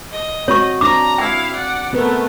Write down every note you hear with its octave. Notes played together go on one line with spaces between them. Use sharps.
D#5
C4 F#4 C#5 C#6
C4 D4 A#5 D6
E4 F5 G5
D5 F#5
A3 B3 C4 A#4 B4